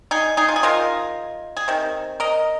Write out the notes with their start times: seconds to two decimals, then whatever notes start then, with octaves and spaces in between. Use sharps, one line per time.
0.11 D#4 G#4
0.37 D#4 G#4
0.48 F4
0.56 G#4
0.63 D#3 G#3 F4 A#4
1.57 G#4
1.68 C3 D#3
2.20 A#4 D#5